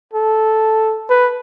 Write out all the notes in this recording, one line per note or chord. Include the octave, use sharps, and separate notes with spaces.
A4
B4